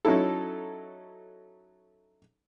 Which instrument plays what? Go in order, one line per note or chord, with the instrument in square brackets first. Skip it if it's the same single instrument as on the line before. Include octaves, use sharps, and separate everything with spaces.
[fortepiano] F#3 C#4 D#4 E4 A4